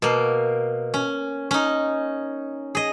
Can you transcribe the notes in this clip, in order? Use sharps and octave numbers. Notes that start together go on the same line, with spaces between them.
B2 A#3
C#4
C#4 D#4
G#4 D#5